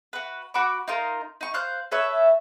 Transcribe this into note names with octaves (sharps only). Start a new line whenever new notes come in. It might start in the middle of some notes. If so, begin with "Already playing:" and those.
F#4 B4
F#4 F#5 B5 D6
D#4 F4 A#4
D#4 C#6
C5 F5 F#6 G6
A4 B4 C#5 E5